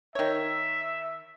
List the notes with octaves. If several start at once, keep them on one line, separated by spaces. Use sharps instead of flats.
D#3 C#5 E5